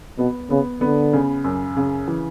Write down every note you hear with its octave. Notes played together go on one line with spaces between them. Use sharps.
B2 B3
C#3 B3
D3 B3
C#3
F#2
C#3
E3